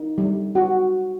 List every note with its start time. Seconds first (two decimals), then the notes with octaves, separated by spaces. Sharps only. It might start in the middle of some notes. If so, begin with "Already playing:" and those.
Already playing: D#4
0.18 G3
0.55 F#4